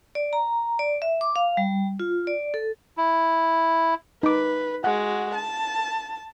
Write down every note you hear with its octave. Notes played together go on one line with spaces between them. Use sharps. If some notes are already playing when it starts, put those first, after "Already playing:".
D5
A#5
D5
E5
D6
F5
G3
F4
D5
A4
E4
D#4 B4 D6
G#3 F#4 F#5
A5